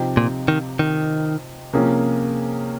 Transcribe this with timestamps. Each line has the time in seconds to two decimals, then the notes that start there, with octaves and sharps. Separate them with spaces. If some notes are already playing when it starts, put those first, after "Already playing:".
Already playing: C3 F3 C4 D#4 G4
0.17 A#2
0.48 D#3
0.79 D#3
1.73 C3 F3 A#3 C#4 G#4